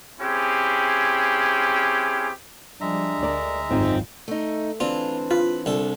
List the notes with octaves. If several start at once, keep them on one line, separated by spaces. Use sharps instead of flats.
C4 C#4 E4 G4 G#4
F3 G3 G#3 D4 E5 A#5
D2 A#4 D5
G#1 F#2 C4 D#4 F4 G#4
A3 D#4
E3 C4 D4 F4
F4 B4
C2 D4 A4